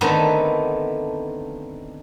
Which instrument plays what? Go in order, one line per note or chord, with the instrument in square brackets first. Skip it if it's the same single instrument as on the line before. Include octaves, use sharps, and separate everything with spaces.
[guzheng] D3 D#3 A3 B3 C4 D#4